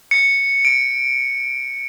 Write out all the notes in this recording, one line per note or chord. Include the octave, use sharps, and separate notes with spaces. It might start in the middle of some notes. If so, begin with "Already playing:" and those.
C#7
D7